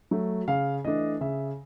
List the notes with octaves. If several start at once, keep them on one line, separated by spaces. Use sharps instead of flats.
F#3 A3
C#3 F5
E3 A3 D4 D#5
C#3 E5